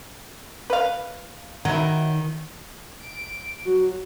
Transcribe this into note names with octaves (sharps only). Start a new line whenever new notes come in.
B4 F5
D#3 F#3 E4
D7
F#3 F#4